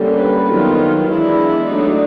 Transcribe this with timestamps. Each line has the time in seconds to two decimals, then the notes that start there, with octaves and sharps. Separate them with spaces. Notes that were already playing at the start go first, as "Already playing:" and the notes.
Already playing: D3 G3 A#3 C#4
0.18 B4
0.48 D#3 F#3 B3 F4
1.07 E3 G#3 B3 D4 E4
1.67 F#3 A3 D4 D#4